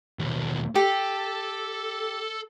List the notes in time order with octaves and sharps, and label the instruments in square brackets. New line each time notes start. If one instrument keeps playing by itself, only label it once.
[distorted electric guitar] D#2 B2
[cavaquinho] G4 [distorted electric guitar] A4